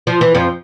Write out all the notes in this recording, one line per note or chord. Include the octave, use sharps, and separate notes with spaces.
F3
E3
F2 F3